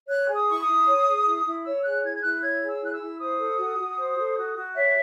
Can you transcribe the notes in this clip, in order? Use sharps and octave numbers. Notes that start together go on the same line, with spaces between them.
C#5 F#6
G#4
D#6
E4 C#6
D#6
E4
C#5
G#4
E4
E4
C#5 E6
G#4 F#6
E4 G#6
G#6
E4 F#6
C#5 G#6
G#4
E6
E4 F#6
E6
E4
C5 D#6
A4
F#4
F#4
C5
A4
F#4
F#4
C#5 E5